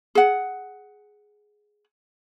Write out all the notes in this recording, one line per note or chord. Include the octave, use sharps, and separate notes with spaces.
G#4 F#5